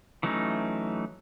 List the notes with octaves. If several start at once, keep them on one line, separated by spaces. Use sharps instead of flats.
E3 F#3 A3 C#4 D#4